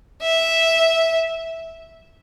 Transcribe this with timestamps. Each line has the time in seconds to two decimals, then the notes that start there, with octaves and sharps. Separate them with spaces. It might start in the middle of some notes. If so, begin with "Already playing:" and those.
0.22 E5